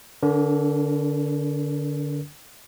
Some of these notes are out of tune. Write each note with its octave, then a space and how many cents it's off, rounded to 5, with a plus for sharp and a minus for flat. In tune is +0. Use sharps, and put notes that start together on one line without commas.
D3 +0 D4 -45 A#4 +25